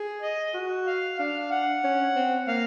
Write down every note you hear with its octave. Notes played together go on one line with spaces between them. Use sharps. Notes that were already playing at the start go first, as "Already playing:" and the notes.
Already playing: G#4
D#5
F#4
F5
D4 F5
F#5
C#4
C4
A#3 F5